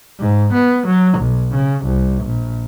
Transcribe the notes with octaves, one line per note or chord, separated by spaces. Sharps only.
G#2
B3
F#3
B1
C#3
C2
A#1